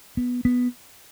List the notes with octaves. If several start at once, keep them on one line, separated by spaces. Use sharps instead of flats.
B3
B3